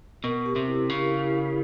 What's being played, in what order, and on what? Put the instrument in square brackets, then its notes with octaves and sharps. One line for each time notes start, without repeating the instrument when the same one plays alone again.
[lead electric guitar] B2 [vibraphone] A#4
[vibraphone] G4
[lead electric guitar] C3
[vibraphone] E4
[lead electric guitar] C#3 [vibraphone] A#4
[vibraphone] E4
G4